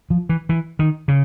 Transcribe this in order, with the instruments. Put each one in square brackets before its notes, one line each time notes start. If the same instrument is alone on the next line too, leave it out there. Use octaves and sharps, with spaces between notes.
[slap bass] F3
E3
E3
D#3
C#3